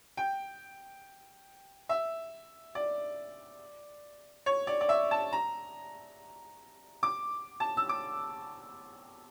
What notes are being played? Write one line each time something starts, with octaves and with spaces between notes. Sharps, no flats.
G5
E5
D5
C#5
D5
D5
E5
A5
A#5
D6
A5
E6
D6